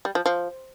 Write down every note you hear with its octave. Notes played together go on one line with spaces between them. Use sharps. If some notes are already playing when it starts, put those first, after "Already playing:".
G3
F3
F3